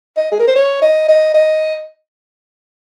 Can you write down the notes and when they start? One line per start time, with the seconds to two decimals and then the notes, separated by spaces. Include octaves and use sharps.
0.17 D#5
0.32 G#4
0.40 A#4
0.47 C5
0.56 C#5
0.82 D#5
1.08 D#5
1.34 D#5